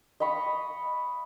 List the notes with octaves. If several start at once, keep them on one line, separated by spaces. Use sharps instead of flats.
D#5 F5 B5 C#6